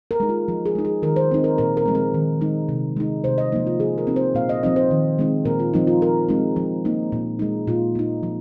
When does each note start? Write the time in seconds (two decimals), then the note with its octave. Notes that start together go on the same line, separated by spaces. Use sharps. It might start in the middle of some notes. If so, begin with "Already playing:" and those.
0.11 A#4
0.20 G#3 D#4
0.29 F4
0.48 F3
0.66 G#4
0.75 G#3 D#4
0.85 G#4
1.02 D#3 A#4
1.16 C5
1.31 C4 D#4
1.44 A#4
1.58 A#2 A#4
1.77 A#4
1.86 F3 G#3 C4
1.95 A#4
2.14 D#3
2.41 G#3 D#4
2.69 C3
2.97 G#3 D#4
3.24 C3 C5
3.38 D#5
3.52 F3 A#3 D#4
3.67 F4
3.80 F3 G#4
3.98 A#4
4.07 C4 D#4
4.16 C5
4.35 A#2 F5
4.49 D#5
4.63 F3 C4 D#4 D#5
4.76 C5
4.91 D#3
5.19 G#3 C4 D#4
5.45 A#2 A#4
5.60 F4
5.73 F3 C4 D#4
5.87 F4
6.02 F3 A#4
6.29 G#3 C4 D#4
6.56 F3
6.85 A#3 D#4
7.12 A#2
7.39 G#3 D#4
7.67 A#2 F4
7.95 A#3 D#4
8.23 F3